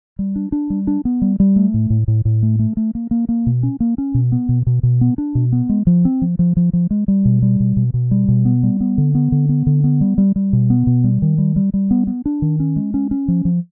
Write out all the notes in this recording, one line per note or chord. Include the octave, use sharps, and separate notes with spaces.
G3
D4
D4
G3
D4
B3
G3
G3
A3
A2
A2
A2
A2
A3
A3
A3
A#3
A#3
A#3
B2
C#4
A#3
C#4
B2
B3
B2
B2
B2
B3
D4
B2
B3
G#3
F3
C4
F3
F3
F3
F3
G#3
G3
B2
G3
B2
B2
B2
G3
B2
B3
G3
B3
D3
B3
D3
B3
D3
B3
G3
G3
G3
B2
B3
B2
G3
D#3
G3
G3
G3
B3
B3
D4
D#3
C#4
G#3
C#4
C#4
F3
F3